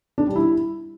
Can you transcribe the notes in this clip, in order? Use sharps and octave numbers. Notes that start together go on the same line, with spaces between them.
D4
G3
E4